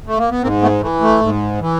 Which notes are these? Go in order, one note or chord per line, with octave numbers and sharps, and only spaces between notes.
A3
A#3
B3
G#2 A#3 C4
A3 B3
E3 A3
A3
G#2
E3